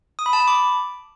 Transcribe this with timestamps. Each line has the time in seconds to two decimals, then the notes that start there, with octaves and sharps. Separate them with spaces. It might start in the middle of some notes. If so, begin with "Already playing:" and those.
0.19 D#6
0.26 B5
0.33 A5
0.40 B5
0.48 D6